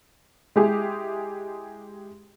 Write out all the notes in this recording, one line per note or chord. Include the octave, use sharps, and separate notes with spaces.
G#3 E4 G4 G#4